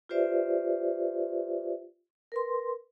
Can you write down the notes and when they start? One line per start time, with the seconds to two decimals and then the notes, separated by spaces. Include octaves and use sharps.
0.09 F4 G4 B4 C5 D5 E5
2.32 A#4 B4 C6